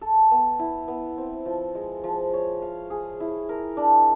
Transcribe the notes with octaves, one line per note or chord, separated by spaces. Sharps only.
A4
B3
E4
B3
C4
F3
G#3
F3
C#5
F5
G#4
E4
A#4
D4